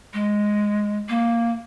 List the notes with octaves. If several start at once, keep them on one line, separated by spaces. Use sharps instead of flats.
G#3
A#3